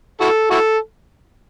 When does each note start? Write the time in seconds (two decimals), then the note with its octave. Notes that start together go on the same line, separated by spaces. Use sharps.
0.21 E4 F#4 A4
0.51 E4 F#4 A4